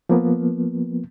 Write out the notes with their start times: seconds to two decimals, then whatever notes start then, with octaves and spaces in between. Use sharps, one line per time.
0.09 F3 A#3 B3